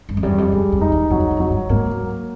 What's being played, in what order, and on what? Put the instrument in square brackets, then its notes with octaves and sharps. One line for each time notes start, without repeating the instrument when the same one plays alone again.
[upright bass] G2
F2
[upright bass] F#2 [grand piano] G3
[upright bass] E2
F2
[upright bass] F#2 [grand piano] G#3
[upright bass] F2
[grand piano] D#4
[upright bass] E2
[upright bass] F2 [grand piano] F#3
[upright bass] F2
[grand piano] F#3
[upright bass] G2
[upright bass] G#2 [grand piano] A#3